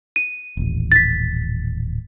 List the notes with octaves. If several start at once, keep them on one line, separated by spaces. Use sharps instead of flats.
D#7
D#1 A1
A6 B6